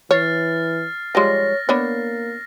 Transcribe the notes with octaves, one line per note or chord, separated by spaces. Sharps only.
E3 C#5 F6 A6 C7
F3 G3 G#3 C#5 A#6
A#3 B3 D4 C#5